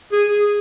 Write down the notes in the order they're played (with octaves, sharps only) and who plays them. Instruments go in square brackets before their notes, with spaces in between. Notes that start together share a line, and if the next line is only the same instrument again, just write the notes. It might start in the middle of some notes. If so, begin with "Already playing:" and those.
[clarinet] G#4